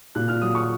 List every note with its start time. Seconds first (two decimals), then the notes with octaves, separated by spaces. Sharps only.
0.15 A#2 F#6
0.28 F6
0.42 F#3 D#6
0.55 C#6